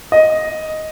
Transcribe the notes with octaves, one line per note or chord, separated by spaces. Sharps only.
D#5